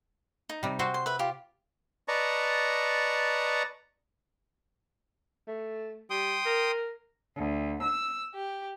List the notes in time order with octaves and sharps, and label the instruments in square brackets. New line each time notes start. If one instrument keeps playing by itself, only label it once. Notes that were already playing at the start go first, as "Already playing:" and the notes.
[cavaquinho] D#4
[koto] C3 G3
C4 F#4 C5
[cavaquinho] C6
B4 E5
F4 G4
[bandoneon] B4 D5 D#5 A5 A#5 C#6
[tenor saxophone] A3
[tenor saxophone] G3 [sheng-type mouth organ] G5 C6 D#6
[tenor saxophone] A#4
[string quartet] D2
E6
G4